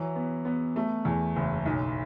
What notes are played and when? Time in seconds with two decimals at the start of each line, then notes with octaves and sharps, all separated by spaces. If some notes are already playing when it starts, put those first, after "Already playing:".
Already playing: E3 F#3
0.16 B3
0.45 B3
0.76 A3
1.05 E2
1.36 F#1
1.66 B1